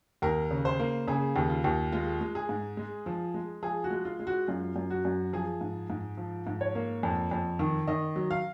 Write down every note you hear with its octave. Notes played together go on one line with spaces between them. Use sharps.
D#2 A#4
C#3
C5
A#3
C#3 G#4
D#2
F4
D#2
G#3 F4
G#3
G#4
G#2
G#3
F3
G#3
F3 G#4
F#4
G#3
F4
G#3
F#4
F#2 F4
F#2
F#4
F#2
F3 G#4
G#2
G#2
F3
G#2
C#5
A#3
F2
F2
D#3
D#3 D#5
F#3
F5